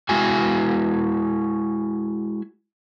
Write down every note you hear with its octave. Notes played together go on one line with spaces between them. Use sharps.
G#3 E4 F#4 G#5